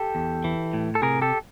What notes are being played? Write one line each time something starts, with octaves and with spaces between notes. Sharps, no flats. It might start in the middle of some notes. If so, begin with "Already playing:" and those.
Already playing: G4 A4
E2
E3
A2
A4
C3 G#4 A#4
G4 A4